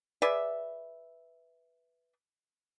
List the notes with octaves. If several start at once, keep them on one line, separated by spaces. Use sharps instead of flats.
G#4 B4 D5 E5